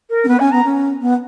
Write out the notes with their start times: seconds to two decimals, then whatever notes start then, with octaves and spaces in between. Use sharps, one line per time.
0.10 A#4
0.24 C#4
0.28 B3 B4
0.40 C#4 G#5
0.52 B3 A#5
0.65 C#4
1.01 B3